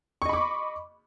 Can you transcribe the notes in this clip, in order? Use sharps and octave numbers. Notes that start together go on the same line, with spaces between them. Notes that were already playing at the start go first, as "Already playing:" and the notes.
D#5 B5 C#6 D6